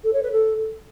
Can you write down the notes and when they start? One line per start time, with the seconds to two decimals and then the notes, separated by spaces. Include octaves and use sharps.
0.04 A4
0.13 C#5
0.23 B4
0.32 A4